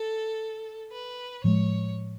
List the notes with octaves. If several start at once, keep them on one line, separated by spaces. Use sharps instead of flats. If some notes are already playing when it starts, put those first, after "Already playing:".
Already playing: A4
B4
A2 F3 G#3 C#5